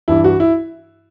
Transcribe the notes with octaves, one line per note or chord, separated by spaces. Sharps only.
G2 E3 E4
F#4
E4